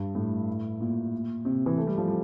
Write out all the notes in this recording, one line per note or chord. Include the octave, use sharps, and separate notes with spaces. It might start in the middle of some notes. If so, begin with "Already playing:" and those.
Already playing: G2
A2
A#2
C3
E3
A3
G3
F3
G3